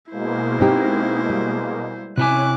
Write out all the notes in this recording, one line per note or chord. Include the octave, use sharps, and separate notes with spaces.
B2 G#3 A#3 E4 C5
C4 D#4 G4
G3
C3 C#4 E4 G#5 D6 F#6